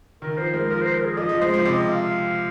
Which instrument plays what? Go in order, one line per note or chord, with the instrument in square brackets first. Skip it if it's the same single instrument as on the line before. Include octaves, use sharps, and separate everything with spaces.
[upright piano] D#3 [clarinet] A#4
[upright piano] F3 [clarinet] C5
[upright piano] G#3 [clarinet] A#4
[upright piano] F3 [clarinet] A#4
[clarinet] C5
A#4
G#4
[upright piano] F3 [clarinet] D#5
[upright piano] F3
[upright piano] G#3 [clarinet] C5
[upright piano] F3
[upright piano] C3 [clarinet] D#5
[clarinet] F5